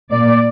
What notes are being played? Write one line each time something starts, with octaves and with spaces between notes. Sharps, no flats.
A#2 A#3 D5